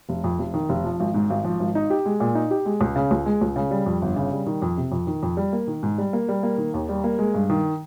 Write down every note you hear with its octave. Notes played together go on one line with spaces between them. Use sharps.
F1
F2
F1
D#3
F1
F3
G#1
G#2
G#1
F3
G#1
D#4
G4
G#3
A#2
D#4
G4
G#3
C#2
C#3
C#2
G#3
C#2
C#3
G3
F2
G1
C#3
G3
D#3
F2
C3
F2
D#3
F2
G3
A#3
D#3
G#2
G3
A#3
G3
A#3
D#3
D#2
G3
A#3
G#3
G2
D#3